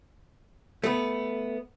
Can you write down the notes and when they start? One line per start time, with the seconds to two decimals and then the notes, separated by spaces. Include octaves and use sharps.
0.84 A3 B3